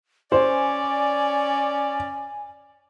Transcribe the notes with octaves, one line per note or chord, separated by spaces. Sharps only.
C#4 C5 D5 G#5